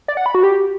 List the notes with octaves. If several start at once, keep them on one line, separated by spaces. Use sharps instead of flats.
D5
F#5
B5
F#4
G4